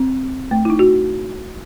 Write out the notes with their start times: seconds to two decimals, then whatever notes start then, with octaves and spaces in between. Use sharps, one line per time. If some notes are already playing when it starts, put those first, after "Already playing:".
Already playing: C4
0.51 A3
0.65 E4
0.70 D#4
0.79 F#4